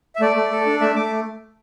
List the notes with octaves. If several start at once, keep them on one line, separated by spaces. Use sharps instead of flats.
E5
A3 D5
A3
A4
D4
A3 E5
A3 D6